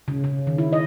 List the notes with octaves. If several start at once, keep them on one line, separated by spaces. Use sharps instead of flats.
C#3
C#3
D#3
E4
D#5